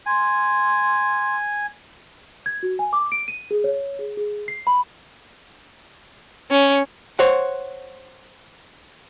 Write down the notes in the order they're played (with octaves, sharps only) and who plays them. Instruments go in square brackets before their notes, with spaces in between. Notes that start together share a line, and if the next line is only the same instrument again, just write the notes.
[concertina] G#5 [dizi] C6
[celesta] G#6
F#4
G#5
D6
D7
D#7
G#4
C#5
G#4
G#4
C7
B5
[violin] C#4
[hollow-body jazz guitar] C5 C#5 F#5